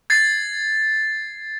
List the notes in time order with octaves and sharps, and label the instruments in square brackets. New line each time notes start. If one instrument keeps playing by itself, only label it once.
[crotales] G#6 A6 C7